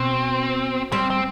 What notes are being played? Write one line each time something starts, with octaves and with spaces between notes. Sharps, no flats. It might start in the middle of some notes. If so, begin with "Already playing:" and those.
Already playing: B2 C4
G3 C4
C4